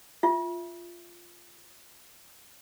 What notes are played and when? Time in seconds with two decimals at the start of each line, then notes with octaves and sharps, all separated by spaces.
0.23 F4 E5